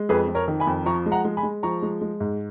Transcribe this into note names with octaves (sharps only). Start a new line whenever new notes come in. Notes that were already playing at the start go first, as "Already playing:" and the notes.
Already playing: G#3
F2 G#4 B4
F2
A#4 C#5
D#3
G#5 B5
F2
F3 A#5 C#6
G#3
F#5 A#5
G#3
G#5 B5
G#3
F3 A#5 C#6
G#3
G#3
G#2